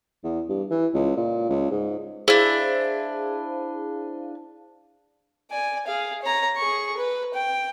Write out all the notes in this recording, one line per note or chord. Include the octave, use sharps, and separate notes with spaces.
E2
G2
E3
C#2
A#2
C#2
G#2
D4 E4 G#4 C5 F5
D5 G#5
G#4 F5
C#5 A#5
G#4 C#6
B4
G5